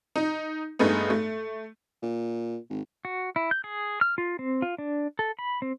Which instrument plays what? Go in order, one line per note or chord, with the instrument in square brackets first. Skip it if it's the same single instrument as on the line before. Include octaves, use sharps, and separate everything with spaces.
[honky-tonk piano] D#4
G2 G#3 A3 B3 D#4
A3
[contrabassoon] A#2
G#1
[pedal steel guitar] F#4
E4
G6
G#4
F6
F4
C4
F4
D4
A4
B5
C4